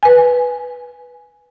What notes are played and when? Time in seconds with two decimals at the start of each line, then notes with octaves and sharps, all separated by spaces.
0.03 B4 G#5